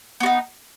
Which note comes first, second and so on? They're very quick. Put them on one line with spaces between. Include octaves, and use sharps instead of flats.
B3 F#4 D#4